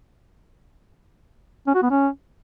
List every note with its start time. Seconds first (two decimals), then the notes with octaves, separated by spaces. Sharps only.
1.67 C#4
1.75 F#4
1.83 B3
1.90 C#4